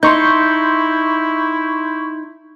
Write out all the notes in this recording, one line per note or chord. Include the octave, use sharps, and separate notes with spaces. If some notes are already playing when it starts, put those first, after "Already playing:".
D#4 E4 C6 C#6 G6